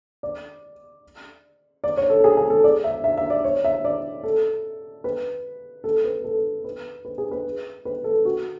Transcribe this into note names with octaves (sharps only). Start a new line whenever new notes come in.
D5
D5
C#5
A4
G#4
G#4
A4
D5
E5
E5
E5
D5
C#5
E5
D5
A4
B4
A4
B4
A4
B4
B4
G#4
B4
B4
A4
F#4